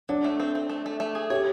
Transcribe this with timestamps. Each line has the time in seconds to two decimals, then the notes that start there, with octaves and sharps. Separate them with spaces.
0.09 F#3 D4
0.24 A3
0.40 C4
0.55 C4
0.70 A3
0.86 A3
1.00 A3
1.15 G#4
1.30 G4 C#5